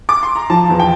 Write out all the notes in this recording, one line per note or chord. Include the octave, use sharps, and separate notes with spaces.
D6
C6
A#5
F3 A5
E2
G5